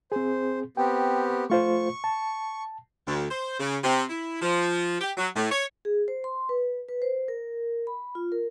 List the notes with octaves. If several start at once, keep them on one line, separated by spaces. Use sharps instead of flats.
C4 G#4 C5
B3 C4 G4 G5
A3 F4 C5 C#6
A5
D2
C5
C#3
C3
E4
F3
G4
F#3
A2
C#5
G#4
C5
C6
B4
B4
C5
A#4
B5
F4
A#4